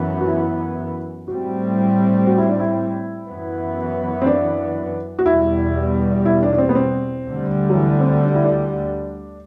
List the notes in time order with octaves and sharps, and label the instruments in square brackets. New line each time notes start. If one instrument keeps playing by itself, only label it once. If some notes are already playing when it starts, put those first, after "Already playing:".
Already playing: [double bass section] F#2 E3 B3
[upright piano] F#4
E4
[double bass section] A2 G3 C4 [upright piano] F#4
[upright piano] F#4
E4
D4
E4
[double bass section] F#2 E3 B3
[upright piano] C4
D4
F#4
[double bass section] E2 B2 G3 [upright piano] E4
[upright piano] E4
D4
D4
C4
B3
C4
[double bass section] D2 D3 G3
[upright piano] F#3
E3
C4
D4
E4
D4